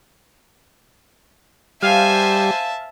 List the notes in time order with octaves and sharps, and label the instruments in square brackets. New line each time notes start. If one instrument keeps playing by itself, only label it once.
[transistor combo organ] G3 [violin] C5 G#5 [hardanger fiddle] E5 A5 [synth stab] F5